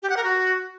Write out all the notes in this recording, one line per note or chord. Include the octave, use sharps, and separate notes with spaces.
G4
F#5
A#4
F#4